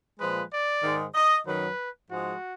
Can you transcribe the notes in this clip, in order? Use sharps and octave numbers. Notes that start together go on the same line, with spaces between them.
A#2 F3 G#3 B4
D5
G#2 D#3 G#3
D#5
F#2 D#3 F#3 B4
G#2 F3 G#3 F#4